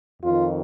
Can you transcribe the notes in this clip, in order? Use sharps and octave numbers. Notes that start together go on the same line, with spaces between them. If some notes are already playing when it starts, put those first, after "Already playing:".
F2 D#3 F4